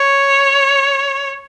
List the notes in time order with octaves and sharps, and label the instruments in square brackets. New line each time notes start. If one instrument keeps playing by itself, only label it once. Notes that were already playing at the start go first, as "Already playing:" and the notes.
Already playing: [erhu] C#5